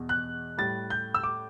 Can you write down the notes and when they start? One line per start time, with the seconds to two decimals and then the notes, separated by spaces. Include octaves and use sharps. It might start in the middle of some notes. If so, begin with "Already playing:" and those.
Already playing: E2 B2
0.09 F#6
0.57 A2 G3 A6
0.90 G6
1.14 E6
1.24 D6